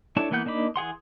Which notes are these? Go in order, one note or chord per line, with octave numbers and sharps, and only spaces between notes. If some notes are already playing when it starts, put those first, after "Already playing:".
A3 D4 E4 C#5 A5
E3 A#3 B3 F#5 G6
A#3 D4 D#4 B5 D6
E3 G#4 F#5 C6